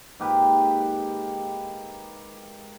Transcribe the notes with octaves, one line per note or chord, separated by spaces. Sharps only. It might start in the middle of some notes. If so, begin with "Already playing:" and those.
G#2 A#3 G4 B4